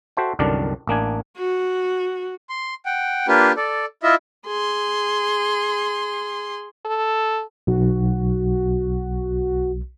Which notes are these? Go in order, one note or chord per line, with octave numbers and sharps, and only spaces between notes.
F#4 A4 C5 E5 G5
C2 F#2 D3 D#3 D4 D5
A1 A#3 D4 G#5
F#4
C6
F#5 G5
A#3 D4 F4 G4 B4
A4 D5
E4 F4 D#5 E5
G#4 C6
A4
B1 F#4